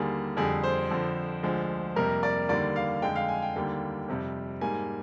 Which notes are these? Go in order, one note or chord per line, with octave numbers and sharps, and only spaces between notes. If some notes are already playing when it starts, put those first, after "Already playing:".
Already playing: D#2 D3 G3 A#3 G#4
F2 D3 G3 G#4
C5
F2 D3 F3
D2 D3 F3 G#3
F2 C3 G3 A#3 A#4
D5
D#2 D3 G3 A#3 D5
F5
F2 D3 G#3 G5
F5
G#5
G5
D#2 D3 G3 A#3
F2 C3 G3
G#2 G3 A#3 G#5